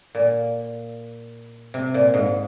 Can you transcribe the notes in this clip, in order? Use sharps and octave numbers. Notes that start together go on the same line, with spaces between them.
A#2
C3
A#2
G#2